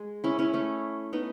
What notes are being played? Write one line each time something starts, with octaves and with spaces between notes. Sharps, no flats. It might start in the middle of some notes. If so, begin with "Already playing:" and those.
Already playing: G#3
C#4 E4
C#4 E4
A3 C#4
B3 D#4